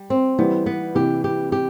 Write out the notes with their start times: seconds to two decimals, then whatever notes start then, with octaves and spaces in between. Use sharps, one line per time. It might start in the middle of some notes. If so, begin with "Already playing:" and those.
Already playing: G3
0.10 C4
0.38 E3 G3 B3
0.66 B3
0.95 C3 E3 G4
1.24 G4
1.52 G4